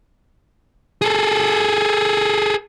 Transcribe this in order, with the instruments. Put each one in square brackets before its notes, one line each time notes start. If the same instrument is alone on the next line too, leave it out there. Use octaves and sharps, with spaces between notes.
[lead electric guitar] G#4 A4